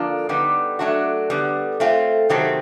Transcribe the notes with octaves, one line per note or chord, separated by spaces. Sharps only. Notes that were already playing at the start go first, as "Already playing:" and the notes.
Already playing: D3 F3 A#3 D4 F4
D3 G3 B3 D#4 G4
F#3 A3 D4 F#4
D3 G3 B3
A3 C4 F4
C3 D#3 F#3 A3 C4